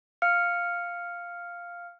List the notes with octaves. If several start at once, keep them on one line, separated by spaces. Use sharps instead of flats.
F5 F6 C#7